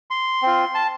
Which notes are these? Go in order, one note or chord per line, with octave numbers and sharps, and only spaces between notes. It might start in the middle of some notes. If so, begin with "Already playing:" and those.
C6
C4 F4
A5